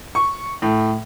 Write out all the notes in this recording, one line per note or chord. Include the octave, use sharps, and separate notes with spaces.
C#6
A2